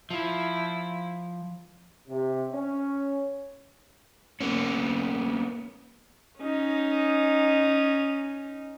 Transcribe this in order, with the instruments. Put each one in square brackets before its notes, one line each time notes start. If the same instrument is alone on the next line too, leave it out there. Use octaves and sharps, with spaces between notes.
[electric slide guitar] F3 [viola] E4
[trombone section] C3
C#4
[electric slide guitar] A#3 B3 C#4
[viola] C#4 D#4